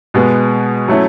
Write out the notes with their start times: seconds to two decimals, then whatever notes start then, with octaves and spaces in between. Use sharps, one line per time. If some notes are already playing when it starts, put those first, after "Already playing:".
0.14 B2 G#3 B3
0.88 F#3 A3 C#4 E4